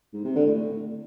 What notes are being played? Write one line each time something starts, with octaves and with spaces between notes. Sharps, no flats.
G#2
C3
D3
A2